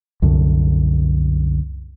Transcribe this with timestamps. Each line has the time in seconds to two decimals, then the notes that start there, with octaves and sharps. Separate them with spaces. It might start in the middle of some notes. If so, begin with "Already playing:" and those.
0.22 C2 F#2 D3